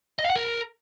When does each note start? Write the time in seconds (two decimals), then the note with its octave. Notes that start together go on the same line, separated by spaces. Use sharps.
0.19 D#5
0.24 F5
0.30 F#5
0.36 A#4